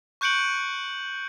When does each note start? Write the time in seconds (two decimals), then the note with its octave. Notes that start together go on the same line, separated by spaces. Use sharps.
0.21 C#6 F#6 G6 C#7 D7 F#7